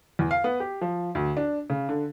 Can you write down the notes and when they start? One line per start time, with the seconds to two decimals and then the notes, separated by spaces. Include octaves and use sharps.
0.19 E2
0.31 F5
0.44 B3
0.60 G4
0.81 F3
1.15 D2
1.37 D4
1.70 C#3
1.89 D3